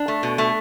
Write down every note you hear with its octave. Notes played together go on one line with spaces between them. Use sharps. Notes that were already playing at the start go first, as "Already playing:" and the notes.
Already playing: D4
A3
B2
A3